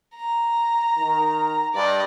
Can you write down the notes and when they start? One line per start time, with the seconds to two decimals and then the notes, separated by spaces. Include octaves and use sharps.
0.16 A#5
0.98 D#3
1.75 G2 D5 D#5